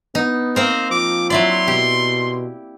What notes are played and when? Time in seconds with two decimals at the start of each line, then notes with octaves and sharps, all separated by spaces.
0.15 B3 D#4
0.56 A#3 C4 A#4 C5
0.91 F3 D6
1.30 F#3 E4 D5 C6
1.68 B2 G4